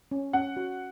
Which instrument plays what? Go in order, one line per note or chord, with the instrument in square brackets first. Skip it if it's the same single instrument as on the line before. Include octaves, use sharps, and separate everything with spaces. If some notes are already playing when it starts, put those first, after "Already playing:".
[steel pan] C#4
[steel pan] C#4 [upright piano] F#5
[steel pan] F#4